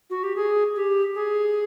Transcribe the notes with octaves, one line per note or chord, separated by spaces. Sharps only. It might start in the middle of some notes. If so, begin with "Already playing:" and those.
F#4
G4
G#4
G4
G#4